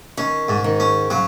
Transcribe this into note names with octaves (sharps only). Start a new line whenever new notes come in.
D#3 C#4
G#2
D#3
C#4
C#3 F#3